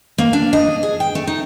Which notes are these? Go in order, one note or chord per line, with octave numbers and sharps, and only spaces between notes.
A#3
D4
D#5
G#4
G5
A3
D#4